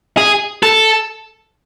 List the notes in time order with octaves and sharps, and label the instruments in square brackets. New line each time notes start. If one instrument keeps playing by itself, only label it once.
[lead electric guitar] G#4
A4